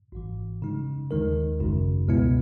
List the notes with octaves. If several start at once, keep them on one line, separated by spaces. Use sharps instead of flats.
G#1 G#2 E3
C#3 G#3 D#4
D#2 D#3 G#3 D#4 A#4
G#1 F#2 C#3
C#2 B2 G#3 B3 E4